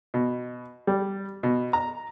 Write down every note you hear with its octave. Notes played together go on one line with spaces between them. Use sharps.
B2
G3
B2
A#5